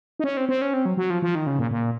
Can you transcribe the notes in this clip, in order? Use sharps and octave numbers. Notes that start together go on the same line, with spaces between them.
D#4
C#4
C4
C4
C#4
C4
F#3
F#3
F3
F3
D#3
C#3
A#2
A#2